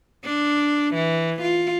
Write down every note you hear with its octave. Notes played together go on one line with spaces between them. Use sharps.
D4
E3
F4